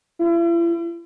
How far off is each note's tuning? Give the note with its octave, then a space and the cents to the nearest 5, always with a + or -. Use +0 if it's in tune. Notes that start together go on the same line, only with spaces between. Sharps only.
E4 +45